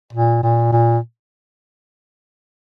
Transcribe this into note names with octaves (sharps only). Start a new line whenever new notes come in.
A#2
A#2
A#2